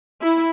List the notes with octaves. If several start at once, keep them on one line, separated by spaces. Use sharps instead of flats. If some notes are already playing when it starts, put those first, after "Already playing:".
E4